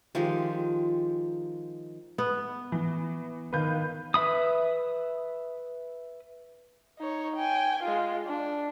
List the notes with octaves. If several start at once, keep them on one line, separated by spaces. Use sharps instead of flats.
D#3 F3 G#3 G4
B3
E3
D#3 B4 F5 G6
B4 E5 B5 D#6
D#4 C#5
G5 G#5
G#3 F4
D4